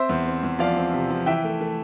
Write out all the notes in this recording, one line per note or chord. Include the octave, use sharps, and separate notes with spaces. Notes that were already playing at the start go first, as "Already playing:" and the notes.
Already playing: C4 C5 E5
E2
C4
E2
F3 D5 F5
C4
C3
F3
E3 E5 G5
A3
A3